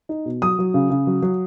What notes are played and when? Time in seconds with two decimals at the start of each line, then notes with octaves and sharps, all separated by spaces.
0.09 D#4
0.25 B2
0.42 F#3 D#6
0.59 F#3
0.74 C#3
0.90 C#3
1.07 F#3
1.22 F#3